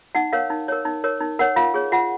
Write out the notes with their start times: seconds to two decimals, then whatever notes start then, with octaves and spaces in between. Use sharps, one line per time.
0.15 D#4 F#5
0.33 A#4 C#5 F5
0.50 D#4
0.68 A#4 C#5
0.85 D#4
1.04 A#4 C#5
1.21 D#4
1.39 A#4 C#5 F#5
1.56 F4 F5
1.74 G#4 C#5
1.92 F4 F#5